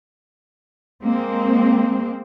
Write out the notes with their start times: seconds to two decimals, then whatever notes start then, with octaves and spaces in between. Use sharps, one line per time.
1.04 G#3 A#3 C4